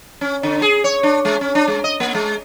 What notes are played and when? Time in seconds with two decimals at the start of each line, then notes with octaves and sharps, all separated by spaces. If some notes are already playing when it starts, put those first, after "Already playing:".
0.21 C#4
0.43 D3
0.62 G#4
0.84 C#5
1.03 D4
1.25 G#3
1.41 C#4
1.55 D4
1.68 G#3
1.84 D#5
2.00 A#3
2.15 G#3